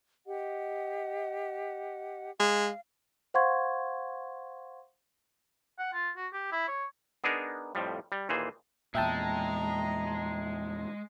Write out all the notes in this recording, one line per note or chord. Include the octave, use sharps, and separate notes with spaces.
G4 D#5 F#5
G#3 F5
C5 F5 F#5 C6 C#6 G#6
F#5
F4
F#4
G4
E4
C#5
B3 D4 D#4 G#4 A#4
F2 A2 F3 G3
G3
D#2 A#2 E3 G#4 C5
E2 A#2 G#3 E5 G5 A5 A#5